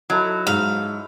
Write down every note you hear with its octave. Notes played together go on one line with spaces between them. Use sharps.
F#3 D#4 E4 A4
G#2 F5